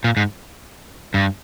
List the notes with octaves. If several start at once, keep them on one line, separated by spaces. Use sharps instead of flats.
A#2
G#2
G2